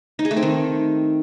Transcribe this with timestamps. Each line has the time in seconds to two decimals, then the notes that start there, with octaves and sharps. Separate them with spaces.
0.19 D#4
0.25 G#4
0.31 A3
0.37 C4
0.42 D#3